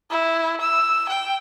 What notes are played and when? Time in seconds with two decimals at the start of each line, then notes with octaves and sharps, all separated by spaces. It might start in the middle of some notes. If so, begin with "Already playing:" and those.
0.10 E4
0.61 E6
1.09 G5